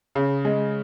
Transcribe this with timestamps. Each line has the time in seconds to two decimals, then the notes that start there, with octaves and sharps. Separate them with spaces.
0.15 C#3
0.45 G#3